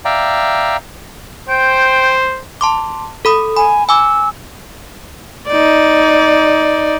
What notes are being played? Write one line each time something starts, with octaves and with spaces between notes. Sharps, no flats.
D5 E5 F5 G5 A#5
C5 G5
A5 C6 D6
A4 B5 D#6
G#5 B5
G#5 D6 E6
D#4 D5